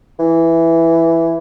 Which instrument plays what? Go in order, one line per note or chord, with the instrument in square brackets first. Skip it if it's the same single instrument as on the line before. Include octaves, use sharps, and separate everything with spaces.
[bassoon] E3